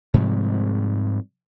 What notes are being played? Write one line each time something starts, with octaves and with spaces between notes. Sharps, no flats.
G#2 C3 F3 G3